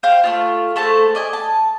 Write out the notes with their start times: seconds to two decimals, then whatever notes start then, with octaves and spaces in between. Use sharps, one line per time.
0.03 C5 F5 G5
0.24 A3 D#4 F4
0.76 A3 A4 C5 A5
1.15 D5 D#5 G#5
1.33 A5